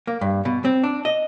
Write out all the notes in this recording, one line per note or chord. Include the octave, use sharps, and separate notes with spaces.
A#3
G2
B2
C4
D4
D#5